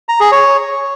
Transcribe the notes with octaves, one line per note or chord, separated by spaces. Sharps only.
A#5
G#4
C#5